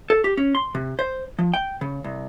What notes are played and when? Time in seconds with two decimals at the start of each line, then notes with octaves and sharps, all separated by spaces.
0.10 A4
0.24 G4
0.37 C#4
0.55 C6
0.75 C3
0.99 C5
1.39 F3
1.54 G5
1.81 C#3
2.04 C2